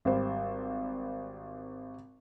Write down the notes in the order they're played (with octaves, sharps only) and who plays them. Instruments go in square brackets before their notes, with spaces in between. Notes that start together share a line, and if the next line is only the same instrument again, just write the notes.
[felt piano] G#1 G3 C5